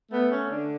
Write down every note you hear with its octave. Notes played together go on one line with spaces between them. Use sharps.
A3 B3
C#4
D3 D4